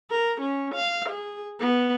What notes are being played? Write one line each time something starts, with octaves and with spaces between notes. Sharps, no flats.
A#4
C#4
F5
G#4
B3